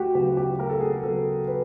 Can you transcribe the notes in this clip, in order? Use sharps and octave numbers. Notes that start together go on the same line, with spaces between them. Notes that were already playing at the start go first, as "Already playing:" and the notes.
Already playing: D2 F#4 G4
C#3 F#3 B3 G4
G4
D2 A#4
A4
G#4
A4
C#3 F#3 B3 A4
B4